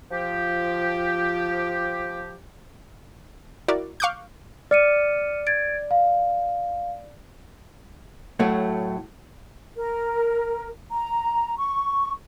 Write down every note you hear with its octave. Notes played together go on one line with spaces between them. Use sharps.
F3 G4
E4 F#4 A#4 D5
F5 C#6 D6 F#6 G6
D5 F6 C#7 D#7
G#6 A6 D7
F5
A2 F#3 A3
A#4
A#5
C#6